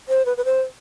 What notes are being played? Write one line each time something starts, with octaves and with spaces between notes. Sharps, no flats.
C5
B4
B4
C5